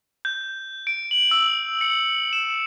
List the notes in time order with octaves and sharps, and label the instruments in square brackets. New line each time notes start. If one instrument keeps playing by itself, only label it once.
[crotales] G6
D7
F#7
E6
C#7
E7